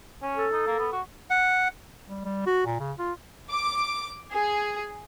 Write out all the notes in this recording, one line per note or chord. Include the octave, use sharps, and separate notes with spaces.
C#4
A4
D#4
A#3
B3
F#4
F#5
G3
G3
F#4
A#2
C#3
F4
D6
G#4